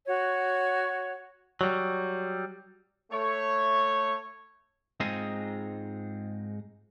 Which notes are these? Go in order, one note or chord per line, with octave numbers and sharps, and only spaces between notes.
F#4 C#5
F#3 G3
A3 C#5
G#2 G#3 C4 D#4 F4 G#4